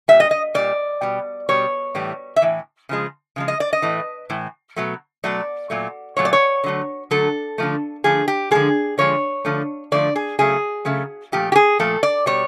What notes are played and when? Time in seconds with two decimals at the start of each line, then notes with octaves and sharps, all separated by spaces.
0.08 A#2 G3 E5
0.20 D#5
0.31 D#5
0.54 A#2 G3 D5
1.02 B2 G3
1.49 B2 G3 C#5
1.95 A2 E3 G3
2.36 E5
2.42 A2 E3
2.89 C#3 F3 G#3
3.36 C#3 F3 G#3
3.48 D#5
3.60 D5
3.73 D#5
3.82 A2 E3 A3
4.30 A2 E3
4.76 B2 F#3 A3
5.24 B2 F#3 A3 D5
5.70 A#2 F#3 A3
6.17 A#2 F#3 A3 C#5
6.25 D5
6.33 C#5
6.64 D3 F#3 A3
7.11 D3 F#3 A3 A4
7.58 D3 F3 A3
8.04 D3 F3 A3 G#4
8.28 G4
8.51 D3 F3 G#3 G#4
8.98 D3 F3 G#3 C#5
9.45 D3 F3 A3
9.92 D3 F3 A3 D5
10.16 G#4
10.39 C#3 F#3 A3 G#4
10.85 C#3 F#3 A3
11.32 A#2 F3 A3 G4
11.52 G4
11.56 G#4
11.79 A#2 F3 A3 A4
12.03 D5
12.26 B2 G3 C#5